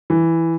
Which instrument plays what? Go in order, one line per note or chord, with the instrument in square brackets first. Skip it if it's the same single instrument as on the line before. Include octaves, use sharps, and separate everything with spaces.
[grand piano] E3